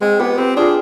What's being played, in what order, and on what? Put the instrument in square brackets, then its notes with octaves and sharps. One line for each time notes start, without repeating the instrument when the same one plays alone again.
[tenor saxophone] G#3 [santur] C4
[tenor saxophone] B3 [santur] G4 B4
[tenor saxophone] C4 [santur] G4 B4
[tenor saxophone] D4 [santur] F4 G#4